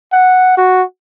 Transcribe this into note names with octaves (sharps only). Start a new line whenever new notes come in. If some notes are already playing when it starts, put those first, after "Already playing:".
F#5
F#4